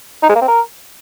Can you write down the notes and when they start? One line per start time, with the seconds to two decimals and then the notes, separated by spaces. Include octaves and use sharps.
0.23 D#4
0.29 G#3
0.35 A#3
0.42 C4
0.48 A#4